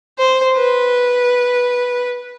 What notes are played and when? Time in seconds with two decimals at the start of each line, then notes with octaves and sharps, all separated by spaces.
0.18 C5
0.56 B4